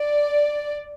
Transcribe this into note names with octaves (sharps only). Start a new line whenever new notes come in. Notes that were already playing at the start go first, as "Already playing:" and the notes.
Already playing: D5